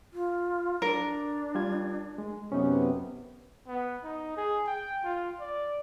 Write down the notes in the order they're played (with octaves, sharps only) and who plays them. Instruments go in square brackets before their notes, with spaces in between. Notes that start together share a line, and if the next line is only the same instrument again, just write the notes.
[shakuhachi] F4
[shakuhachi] D4 [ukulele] A#4
[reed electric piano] G3 F4 G#6
G#3
[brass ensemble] F#2 C3 B3 [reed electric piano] C#4 D#4
[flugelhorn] B3
D#4
G#4
G5
F4
D5